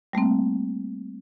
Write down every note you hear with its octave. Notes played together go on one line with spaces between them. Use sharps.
G3 A3 A#3 C4